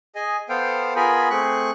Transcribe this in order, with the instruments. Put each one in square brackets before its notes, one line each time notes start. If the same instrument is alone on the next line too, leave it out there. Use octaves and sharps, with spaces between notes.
[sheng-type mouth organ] G#4 D#5 G#5
B3 A4 C5 F5 G5
B3 F4 G#4 A#4 G#5 B5
A3 C4 G#4 C#6 F#6